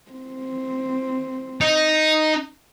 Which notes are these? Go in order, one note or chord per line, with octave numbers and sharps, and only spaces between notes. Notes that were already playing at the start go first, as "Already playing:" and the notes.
C4
D#4